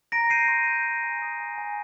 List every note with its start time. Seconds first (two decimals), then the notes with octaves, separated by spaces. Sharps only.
0.12 A#5 A#6 D7
0.30 G6 C7 D#7
0.48 C6
0.67 G6
0.86 G6
1.03 G#5
1.22 D#6
1.40 G#5
1.58 G#5